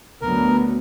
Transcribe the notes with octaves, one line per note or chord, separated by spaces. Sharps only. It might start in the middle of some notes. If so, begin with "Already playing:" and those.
D2 F#3 B3 A#4